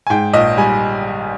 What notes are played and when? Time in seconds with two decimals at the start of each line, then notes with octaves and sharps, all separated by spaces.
0.07 G#5
0.10 G#2 G5
0.33 A#1 D#5
0.58 G3 G#5